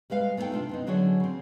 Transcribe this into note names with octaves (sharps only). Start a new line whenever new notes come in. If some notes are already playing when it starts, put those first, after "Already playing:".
G3 G#3 B4 F5
A3 B3 D#4 E4 A4 G5
C3 D4 F4
B3 C4 D#4
D3 F#3 D4 F#4 G#4 C#5
C#3 C4